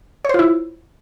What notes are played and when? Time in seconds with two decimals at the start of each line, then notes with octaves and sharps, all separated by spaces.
0.25 C#5
0.29 C5
0.34 F4
0.39 E4